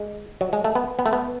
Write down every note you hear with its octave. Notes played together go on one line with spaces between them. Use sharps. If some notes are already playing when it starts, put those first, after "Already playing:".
Already playing: G#3
F#3
G#3
A3
B3
B3
A3
B3